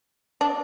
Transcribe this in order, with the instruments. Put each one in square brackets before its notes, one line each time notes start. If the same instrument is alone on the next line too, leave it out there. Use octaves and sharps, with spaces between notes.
[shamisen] D4